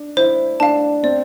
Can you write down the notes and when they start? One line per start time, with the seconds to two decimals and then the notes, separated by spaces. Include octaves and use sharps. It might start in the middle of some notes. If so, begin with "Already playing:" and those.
Already playing: D4
0.17 E4 C5
0.60 D4 F5 A5
1.03 C4 D5